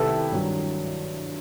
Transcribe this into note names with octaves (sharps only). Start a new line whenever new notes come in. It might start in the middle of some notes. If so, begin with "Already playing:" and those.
Already playing: C2 C3 D#3 E4 G4 A4 B4
G2 D#3 F#3